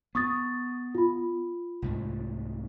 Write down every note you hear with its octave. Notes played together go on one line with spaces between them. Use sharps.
B3 C#6 D#6 A6
F4 B5
C2 G#2 A3